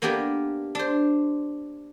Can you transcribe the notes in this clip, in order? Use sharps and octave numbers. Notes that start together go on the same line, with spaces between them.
A#3 B3 D4 G4 A#4 B4
D4 C5